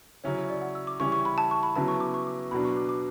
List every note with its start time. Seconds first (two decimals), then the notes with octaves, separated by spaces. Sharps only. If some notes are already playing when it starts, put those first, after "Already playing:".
0.24 C#3 F#3 C#4 E4 C#5
0.37 C#5
0.50 D5
0.62 F#5
0.75 E6
0.87 D6
1.00 C#3 E3 G3 C#4 E4 C#6
1.12 C#6
1.25 B5
1.38 A5
1.51 C#6
1.63 B5
1.76 C#3 F#3 B3 E4 A5
1.88 C#6
2.00 D6
2.14 C#6
2.27 D6
2.39 C#6
2.51 B2 F#3 B3 D4 B5
2.65 C#6
2.77 D6
2.89 D6